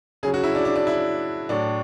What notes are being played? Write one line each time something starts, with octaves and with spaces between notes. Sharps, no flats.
C#3 F#3 G#4
F#4
E4
D4
D4
D4
E4
A2 F#3 D4